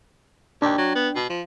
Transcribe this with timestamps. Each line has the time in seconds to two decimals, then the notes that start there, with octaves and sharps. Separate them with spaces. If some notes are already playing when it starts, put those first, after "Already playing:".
0.62 D#2 D4 G5
0.78 F#3
0.95 B3
1.16 B2
1.29 F3